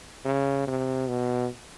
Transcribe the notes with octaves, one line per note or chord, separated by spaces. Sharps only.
C#3
C3
B2